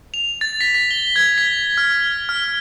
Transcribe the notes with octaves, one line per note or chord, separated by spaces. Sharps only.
F7
A6
B6
B6
G7
G#6
B6
F6
F6